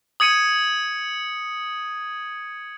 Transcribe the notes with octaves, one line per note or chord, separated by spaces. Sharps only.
D#6 G#6 C#7 D#7